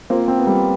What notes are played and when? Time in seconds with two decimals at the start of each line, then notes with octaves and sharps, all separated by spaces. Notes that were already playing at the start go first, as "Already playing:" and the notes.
0.10 A#3 C4 F4
0.28 C4
0.38 B3
0.47 G3